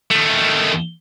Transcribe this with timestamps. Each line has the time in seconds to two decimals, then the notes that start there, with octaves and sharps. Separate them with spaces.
0.11 D#3 A3